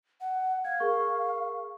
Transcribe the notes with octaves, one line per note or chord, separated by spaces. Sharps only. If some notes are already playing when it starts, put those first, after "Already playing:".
F#5
F5 G#6
G#4 A#4 C#6